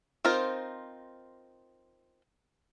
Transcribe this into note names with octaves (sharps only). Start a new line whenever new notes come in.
C4 D#4 F4 A#4 C5